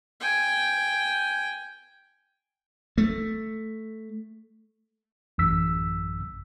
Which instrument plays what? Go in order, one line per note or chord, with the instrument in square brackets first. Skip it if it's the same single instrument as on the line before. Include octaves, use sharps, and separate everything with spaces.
[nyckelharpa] G5 G#5
[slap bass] A3
[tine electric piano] A1 F#2 E6 B6